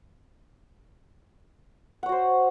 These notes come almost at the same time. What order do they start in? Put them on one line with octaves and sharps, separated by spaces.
F#5 C#5 F#4 C5